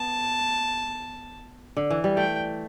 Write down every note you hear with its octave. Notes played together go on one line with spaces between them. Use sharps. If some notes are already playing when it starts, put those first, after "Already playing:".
Already playing: B3 A5
D3
E3
G3
A3 G5